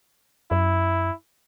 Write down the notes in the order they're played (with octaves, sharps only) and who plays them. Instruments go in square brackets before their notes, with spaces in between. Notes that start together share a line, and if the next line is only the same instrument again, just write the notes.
[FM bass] F#2 [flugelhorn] E4